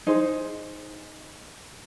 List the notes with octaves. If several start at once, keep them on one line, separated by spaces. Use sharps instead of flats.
D#4 G#4 C5